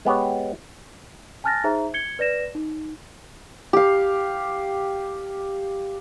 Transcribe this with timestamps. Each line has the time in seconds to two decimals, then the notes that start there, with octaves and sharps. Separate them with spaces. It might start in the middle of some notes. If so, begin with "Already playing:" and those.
0.05 G#3 B3 G4 C#5
1.44 G#5 A5 F6 F#6 A6 A#6
1.64 D#4 G#4 C5 E5 A#5
1.94 G#6 C#7 G7
2.19 B4 D5 A#6 E7
2.55 D#4
3.73 G4 F5